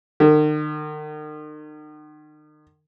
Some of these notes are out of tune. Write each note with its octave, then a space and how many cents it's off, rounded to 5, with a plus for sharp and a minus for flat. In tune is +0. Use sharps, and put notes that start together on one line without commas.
D#3 -40